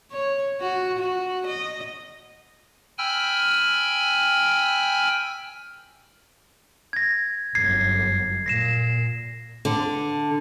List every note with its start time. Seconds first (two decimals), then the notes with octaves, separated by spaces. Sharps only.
0.11 C#5
0.61 F#4
0.99 F#4
1.46 D#5
2.98 G5 G#5 B5 E6 F6
6.93 G#6 A#6
7.55 G1 F#2 G#6 C7
8.46 A#2 A#6 C7 E7
9.65 D3